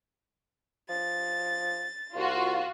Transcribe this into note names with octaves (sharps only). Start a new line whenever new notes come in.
F3 A6
C2 F4 F#4